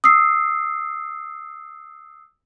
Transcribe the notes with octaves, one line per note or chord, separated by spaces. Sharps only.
D#6 E6 C7